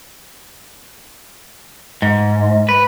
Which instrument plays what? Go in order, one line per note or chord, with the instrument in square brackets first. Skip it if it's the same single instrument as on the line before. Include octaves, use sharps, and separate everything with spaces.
[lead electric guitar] G#2
B4